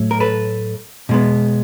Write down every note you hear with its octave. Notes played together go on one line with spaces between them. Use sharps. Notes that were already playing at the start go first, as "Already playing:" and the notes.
Already playing: A2 F#3 A3
A#4
A4 B4
B2 G#3 B3